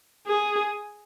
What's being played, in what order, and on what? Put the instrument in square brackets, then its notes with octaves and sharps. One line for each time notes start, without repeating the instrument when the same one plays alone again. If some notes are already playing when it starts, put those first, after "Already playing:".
[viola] G#4